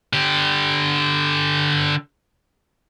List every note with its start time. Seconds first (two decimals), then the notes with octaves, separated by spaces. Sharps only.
0.13 D3 G4